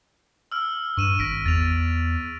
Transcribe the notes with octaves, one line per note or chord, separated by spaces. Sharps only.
E6 F6
G2 C#6 D#7 E7
G#1 A#6 B6 D7
E2 A6 F7